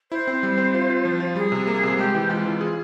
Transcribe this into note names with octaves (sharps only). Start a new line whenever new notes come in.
E4 C5
C4
G3
C4
F4
F4
F3
F4
G3 G#4
C3
A#3
C3
G#3 G4
E3
G#3 F4
E3
G#4